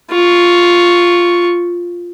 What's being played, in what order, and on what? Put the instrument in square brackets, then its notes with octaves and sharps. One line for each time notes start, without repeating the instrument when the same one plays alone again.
[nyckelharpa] F4 C#6